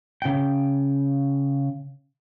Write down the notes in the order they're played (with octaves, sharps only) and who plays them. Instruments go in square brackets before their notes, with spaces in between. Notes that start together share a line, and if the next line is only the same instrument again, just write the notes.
[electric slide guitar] C#3 G5